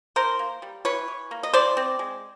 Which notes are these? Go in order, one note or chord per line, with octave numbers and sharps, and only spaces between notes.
E3 A#4 C5
A#3
G3
E3 B4 C#5
E3
A#3
D#5
E3 C5 D5
C4
G#3